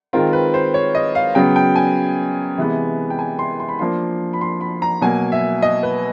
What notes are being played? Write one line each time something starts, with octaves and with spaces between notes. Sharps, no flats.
D#3 G#3 C4 F4 A#4
B4
C5
C#5
D#5
F5
C#3 F#3 B3 G5
G5
G#5
C3 E3 G#3 B3
G5
G#5
C6
C6
B5
F3 A#3 D4 F4 C6
B5
C6
B5
A#5
B2 F#3 A#3 G#5
E5
D#5
B4